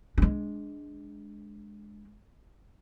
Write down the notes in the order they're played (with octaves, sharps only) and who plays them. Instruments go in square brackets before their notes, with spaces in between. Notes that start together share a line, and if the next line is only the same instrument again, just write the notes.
[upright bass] G#3 D4